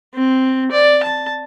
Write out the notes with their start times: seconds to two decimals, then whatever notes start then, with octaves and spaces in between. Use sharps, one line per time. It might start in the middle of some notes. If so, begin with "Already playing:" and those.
0.15 C4
0.71 D5
1.03 A5